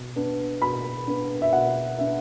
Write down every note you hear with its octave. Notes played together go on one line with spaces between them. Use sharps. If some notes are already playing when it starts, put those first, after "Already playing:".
Already playing: B2
B3 D4
B2 B5
B3 D4
E5
B2 F#5
B3 D4 E5